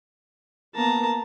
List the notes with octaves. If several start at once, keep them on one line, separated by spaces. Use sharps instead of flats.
A#3 B3 A5 A#5